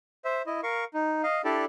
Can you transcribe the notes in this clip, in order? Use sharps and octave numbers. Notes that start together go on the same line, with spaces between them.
C5 E5
E4 D#5
A#4 F5 C#6
D#4
D#5 F5
D4 E4 G4 A4 D5